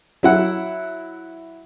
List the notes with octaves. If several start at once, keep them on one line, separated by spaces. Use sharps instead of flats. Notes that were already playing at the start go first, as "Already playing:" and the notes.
F#3 E4 F#5